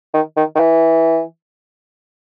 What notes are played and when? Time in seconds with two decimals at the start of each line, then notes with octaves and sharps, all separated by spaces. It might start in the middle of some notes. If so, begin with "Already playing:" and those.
0.14 D#3
0.37 D#3
0.55 D#3
0.60 E3